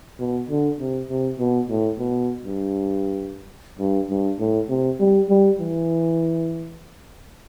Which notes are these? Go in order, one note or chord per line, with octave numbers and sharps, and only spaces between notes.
B2
D3
C3
C3
B2
A2
B2
G2
G2
G2
A2
C3
G3
G3
E3